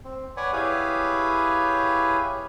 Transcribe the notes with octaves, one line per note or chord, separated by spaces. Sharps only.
C4
B4 C#5 D5 F#5 G#5
E4 G4 G#4 B4 C#5 F5